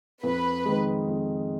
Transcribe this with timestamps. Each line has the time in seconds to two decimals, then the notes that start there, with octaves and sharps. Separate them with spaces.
0.23 F2 B4
0.65 D#3 G#3
1.08 F2